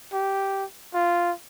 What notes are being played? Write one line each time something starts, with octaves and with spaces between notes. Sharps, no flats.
G4
F4